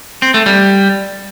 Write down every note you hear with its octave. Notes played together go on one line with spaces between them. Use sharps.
C4
A3
G3